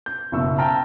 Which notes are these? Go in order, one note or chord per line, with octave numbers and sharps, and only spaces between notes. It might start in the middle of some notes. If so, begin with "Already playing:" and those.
G6
F#1 B1 C#6 E6
G5 A5 A#5 F6